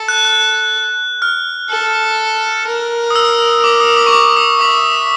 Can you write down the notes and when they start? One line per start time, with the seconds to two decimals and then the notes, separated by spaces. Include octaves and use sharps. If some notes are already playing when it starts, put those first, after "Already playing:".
Already playing: A4
0.08 F#6
0.25 F#6
1.22 F6
1.70 A4
2.67 A#4
3.10 D#6
3.16 E6
3.64 D6
3.80 D#6
3.97 D6
4.07 C#6
4.12 D6
4.37 D#6
4.61 E5 D6